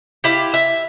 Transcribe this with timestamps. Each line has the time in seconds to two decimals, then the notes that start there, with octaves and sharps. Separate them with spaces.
0.24 E4 F4 G4
0.54 E5